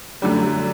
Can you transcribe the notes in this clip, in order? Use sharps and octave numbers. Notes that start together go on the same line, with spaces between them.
F#2 D3 G3 A3